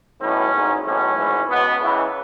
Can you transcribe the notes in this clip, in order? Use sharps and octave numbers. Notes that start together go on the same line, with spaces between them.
B1 A2 E3 C#4
G#1 G#2 D#3
B1 A2 E3 C#4
G#1 G#2 E3
C#2 B2 B3
C#2 C#3 E3